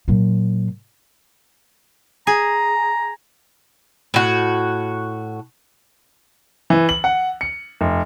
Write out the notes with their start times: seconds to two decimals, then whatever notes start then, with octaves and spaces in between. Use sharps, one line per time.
0.08 A#2 F#3
2.27 G#4 A#5
4.14 A2 F#4
6.70 E3
6.89 F#7
7.04 F#5
7.41 C#7
7.81 F1